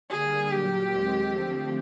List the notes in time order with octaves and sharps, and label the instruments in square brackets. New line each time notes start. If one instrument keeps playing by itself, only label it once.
[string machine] D3 G3 A#3 [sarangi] G#4
[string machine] A#2 F#3 A#3 [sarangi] G4
[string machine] D#2 D#3 G#3 C4
D3 F3 A3 C4